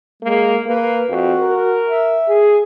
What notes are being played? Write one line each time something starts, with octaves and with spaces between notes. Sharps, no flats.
G#3 A#3
A#3 B4
F2 F#4
A#4
E5
G#4